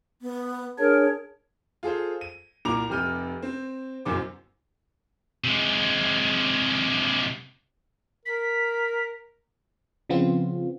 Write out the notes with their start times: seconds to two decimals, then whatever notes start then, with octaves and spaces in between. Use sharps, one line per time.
0.22 B3
0.79 D4 G#4 A#4 C#5
1.83 F4 G#4 A4 C5
2.21 D#7
2.65 C2 A#2 A#4 A#5 D6 F7
2.90 F1 C3 G4 F6 G6 D#7
3.42 C4
4.05 F#1 C2 F#2 B2 C5 D6
5.44 C3 G#3
8.25 A#4 B6
10.09 C#3 F3 B3 C4 F4